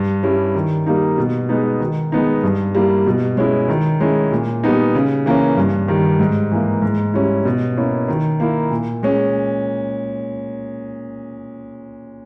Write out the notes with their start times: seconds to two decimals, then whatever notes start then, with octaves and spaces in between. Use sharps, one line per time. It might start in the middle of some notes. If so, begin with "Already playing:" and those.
Already playing: G2
0.23 G3 C#4 E4
0.55 D#3
0.86 G3 A#3 D#4
1.18 B2
1.49 G#3 B3 D#4
1.80 D#3
2.12 G#3 B3 D#4
2.43 G2
2.75 G3 A#3 E4
3.07 B2
3.37 G#3 C#4 E4
3.68 D#3
4.00 G#3 C#4 E4
4.32 A#2
4.64 G3 B3 D#4
4.95 C#3
5.26 E3 A#3 C#4
5.57 G2
5.88 D#3 G3
6.20 G#2
6.51 E3 A#3
6.82 G#2
7.14 G3 C#4 E4
7.45 B2
7.77 A#3 C#4 E4
8.08 D#3
8.40 A#3 E4
8.71 A#2
9.03 G#3 C#4